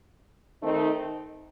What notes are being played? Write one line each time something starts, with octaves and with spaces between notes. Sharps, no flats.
D#3 A3 C4 D#4